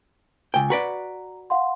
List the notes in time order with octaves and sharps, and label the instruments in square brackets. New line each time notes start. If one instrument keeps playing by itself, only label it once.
[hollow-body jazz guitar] C#2 G5 [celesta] G#5
[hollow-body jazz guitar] F#4 B4 D5 [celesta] A#5
[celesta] F5 F#5 C6